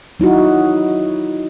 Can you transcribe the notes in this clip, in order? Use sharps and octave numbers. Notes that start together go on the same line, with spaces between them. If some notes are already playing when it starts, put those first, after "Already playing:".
F#3 D#4 E4 F#4